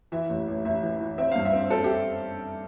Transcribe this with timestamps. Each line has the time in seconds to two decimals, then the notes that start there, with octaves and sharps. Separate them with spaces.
0.12 E3 E5
0.29 A1
0.48 A1
0.65 A1 E5
0.83 E3
1.00 E3
1.18 C4 E5
1.32 G2 F5
1.45 E5
1.53 C4
1.70 C4 A4
1.84 G4